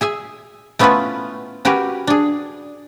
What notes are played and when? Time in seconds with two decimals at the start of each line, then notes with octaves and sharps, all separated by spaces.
0.01 G#4 E5 G#5
0.79 A3 B3 C#4 E4 F4 B4
1.65 C#4 F#4 G4 A#4 B4
2.07 D4 G#4